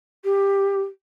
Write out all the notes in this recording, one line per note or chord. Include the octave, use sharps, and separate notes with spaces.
G4